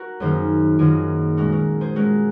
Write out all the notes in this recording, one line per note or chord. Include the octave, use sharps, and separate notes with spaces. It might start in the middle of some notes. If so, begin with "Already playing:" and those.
Already playing: F#4 A#4
F#2 D#3 A#3 D#4 G#4 C5
F#2 D#3 A#3 D#4 F4 G#4
A#2 G#3 C#4 F#4 A#4
F#4 A#4
G#4 C5
A#2 G#3 C#4 F#4 A#4